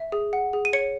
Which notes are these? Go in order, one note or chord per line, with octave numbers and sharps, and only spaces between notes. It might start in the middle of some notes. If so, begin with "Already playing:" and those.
Already playing: E5
G#4
F#5
G#4
D#7
C#5 C#7